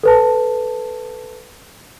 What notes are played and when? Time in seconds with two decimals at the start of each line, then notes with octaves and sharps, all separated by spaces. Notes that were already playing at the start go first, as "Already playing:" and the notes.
0.03 A4 B4 A5